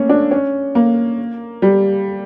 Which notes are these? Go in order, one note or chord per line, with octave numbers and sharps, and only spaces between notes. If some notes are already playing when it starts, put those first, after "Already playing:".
Already playing: A3 A#3 C#4
D4
C#4
A#3
G3